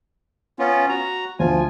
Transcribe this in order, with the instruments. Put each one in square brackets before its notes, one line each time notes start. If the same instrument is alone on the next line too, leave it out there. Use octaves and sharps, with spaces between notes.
[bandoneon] B3 C#4 F4
F#4 A#5
[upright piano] D2 F3 [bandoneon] F4 G#5